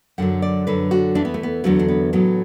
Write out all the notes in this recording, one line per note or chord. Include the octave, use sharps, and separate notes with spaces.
F#2 D3 F#3 F#5
D5
F#2 D3 F#3 B4
F#4
E2 E3 D4
B3
A3
B3
E2 D3 F#3 A3
D4
B3
A2 F#3 B3